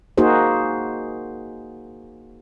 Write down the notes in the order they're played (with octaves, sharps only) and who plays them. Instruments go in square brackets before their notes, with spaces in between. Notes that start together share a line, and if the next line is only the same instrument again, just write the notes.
[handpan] A#3 D#4 F#4 G#4 C5